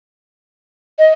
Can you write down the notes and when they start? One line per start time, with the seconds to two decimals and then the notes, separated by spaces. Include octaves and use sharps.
0.99 D#5